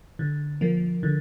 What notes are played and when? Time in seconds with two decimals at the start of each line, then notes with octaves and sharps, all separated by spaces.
0.19 D3
0.61 F3 A#3
1.03 D3